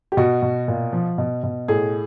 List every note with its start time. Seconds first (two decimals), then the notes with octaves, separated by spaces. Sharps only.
0.12 G4
0.17 B2 F#4
0.42 B2
0.68 A#2
0.93 F3
1.18 B2
1.44 B2
1.68 A2 G#4